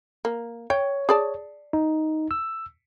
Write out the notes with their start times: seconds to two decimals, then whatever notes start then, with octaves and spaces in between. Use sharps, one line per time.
0.25 A#3
0.70 C#5 G5
1.09 G#4 D5 A5
1.73 D#4
2.31 E6